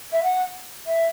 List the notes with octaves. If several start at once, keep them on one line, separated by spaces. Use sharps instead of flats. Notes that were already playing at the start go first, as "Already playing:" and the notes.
E5
F#5
E5